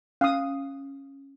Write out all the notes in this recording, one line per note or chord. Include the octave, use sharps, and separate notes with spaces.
C#4 F5 D#6